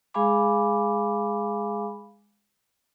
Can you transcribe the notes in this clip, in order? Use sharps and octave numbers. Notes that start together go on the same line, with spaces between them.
G#3 G#4 F5 G#5 B5 D6